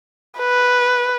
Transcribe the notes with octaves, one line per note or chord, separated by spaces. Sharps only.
B4